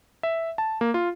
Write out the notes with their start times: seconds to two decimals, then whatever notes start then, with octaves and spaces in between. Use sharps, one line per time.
0.23 E5
0.58 A5
0.81 A#3
0.94 F4